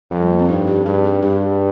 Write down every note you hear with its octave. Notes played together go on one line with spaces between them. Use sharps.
F2 F3
G3
A#3
C4
G2 D#4
G4
G2 G#4
G#4
G2 G4